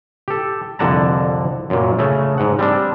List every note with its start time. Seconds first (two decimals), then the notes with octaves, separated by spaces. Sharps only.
0.28 G4 A4
0.79 C2 F2 D3 F#5 A5 A#5
1.70 F#2 A#2
1.99 C#3 A3
2.38 G#2 F#5
2.59 G3 C4 D4